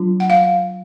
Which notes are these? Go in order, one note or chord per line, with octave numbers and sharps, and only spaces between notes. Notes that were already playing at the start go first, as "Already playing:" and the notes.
Already playing: F#3 D4 F4
F#5
F5